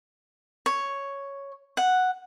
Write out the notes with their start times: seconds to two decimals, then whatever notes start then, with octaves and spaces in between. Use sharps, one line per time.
0.66 C#5
1.77 F#5